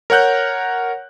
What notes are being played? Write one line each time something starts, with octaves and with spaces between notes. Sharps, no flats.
A#4 C#5 F#5 F#6 G6